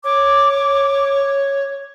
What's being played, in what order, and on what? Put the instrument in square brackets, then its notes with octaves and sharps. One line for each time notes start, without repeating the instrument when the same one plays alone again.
[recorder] C#5 [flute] D6